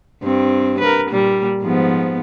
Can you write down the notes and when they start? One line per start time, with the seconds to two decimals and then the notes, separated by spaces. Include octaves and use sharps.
0.23 G2 C4
0.80 A#4 B4
1.10 A#2 G3 A#3
1.62 G#2 F3 B3